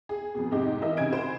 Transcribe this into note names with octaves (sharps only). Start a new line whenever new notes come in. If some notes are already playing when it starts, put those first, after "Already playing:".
G#4
F2 B2
G#2 C3 C4 D#4 G4
E3 D#4 A#4 D#5 E5
C#3 C4 G#5 G#6 D7
B4 C5